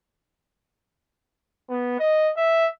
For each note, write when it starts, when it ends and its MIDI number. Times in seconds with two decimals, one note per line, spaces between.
1.69 1.99 59
1.99 2.31 75
2.37 2.67 76